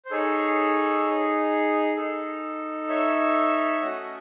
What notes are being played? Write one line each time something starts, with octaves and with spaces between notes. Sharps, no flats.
C5
D#4 G#4 A4 C#5
D#4 A4
C#5 E5
A3 C#4 F#4 A4 D#5 F#5